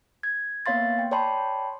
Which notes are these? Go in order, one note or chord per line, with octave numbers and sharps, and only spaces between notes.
G#6
A#3 B3 C#5 F5 C6 A6
G5
C#5 D5 G5 A5 B5 C6